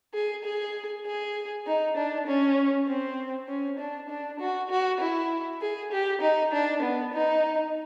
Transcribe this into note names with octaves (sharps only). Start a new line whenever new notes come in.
G#4
G#4
G#4
D#4
D4
C#4
C4
C#4
D4
D4
F#4
F#4
E4
G#4
G4
D#4
D4
B3
D#4